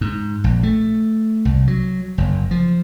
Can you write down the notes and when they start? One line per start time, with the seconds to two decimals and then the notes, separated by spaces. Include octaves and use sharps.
0.01 G#2
0.44 A#1
0.63 A3
1.45 C2
1.67 F#3
2.18 F#1
2.51 F3